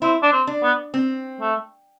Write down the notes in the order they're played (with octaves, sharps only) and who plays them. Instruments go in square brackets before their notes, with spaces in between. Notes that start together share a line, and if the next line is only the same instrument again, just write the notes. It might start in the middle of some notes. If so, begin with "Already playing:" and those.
[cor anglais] C4 [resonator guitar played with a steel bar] E4
[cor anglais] D4
C4
[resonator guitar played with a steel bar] D4
[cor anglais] B3
[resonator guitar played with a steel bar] C4
[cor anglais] A3